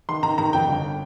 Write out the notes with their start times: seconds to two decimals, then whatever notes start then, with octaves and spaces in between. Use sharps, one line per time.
0.09 D#3 C6
0.23 D#3 A#5
0.38 D#3 A#5
0.53 F2 G5
0.68 G1